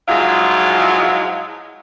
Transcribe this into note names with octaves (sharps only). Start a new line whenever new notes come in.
G#2 F3 F#3 G#3 E4 F4